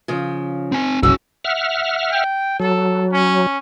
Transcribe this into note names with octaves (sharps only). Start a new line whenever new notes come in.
C#3 F3
C4 G#5
G1 C2 C#4 F#4 G#4 E6
E5 F#5 F6
G5
F#3 A4
C#4